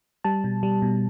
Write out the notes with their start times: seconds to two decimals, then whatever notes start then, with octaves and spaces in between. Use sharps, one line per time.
0.24 G3 A5
0.44 B2
0.63 G3
0.82 B2